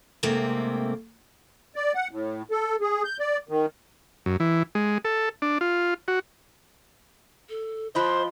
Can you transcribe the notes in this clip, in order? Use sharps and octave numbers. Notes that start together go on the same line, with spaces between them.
G#2 C3 A3 A#3 C4
D5
F#5
A2
A4
G#4
G6
D5
D#3
F#2
E3
G#3
A4
D4
F4
F#4
A4
F3 F4 C5 D#5 G5 B5 C6 F#6